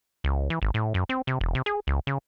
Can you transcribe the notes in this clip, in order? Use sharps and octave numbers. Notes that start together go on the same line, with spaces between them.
C#2
E3
G#1
A2
F#2
C4
C3
E1
C3
G#4
C#2
C#3